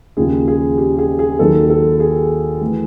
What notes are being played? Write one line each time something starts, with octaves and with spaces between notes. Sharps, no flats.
D#2 C#3 F3 G#4
G#4
G4
G#4
G#4
D#2 D#3 F#3 A4
A4
G#4
E3 A3